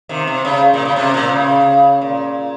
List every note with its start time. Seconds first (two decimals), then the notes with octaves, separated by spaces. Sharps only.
0.09 C3 D#3
0.27 C3
0.45 C#3
0.74 A#2
0.85 C#3
0.96 C3
1.14 A#2
1.32 C#3
2.01 A#2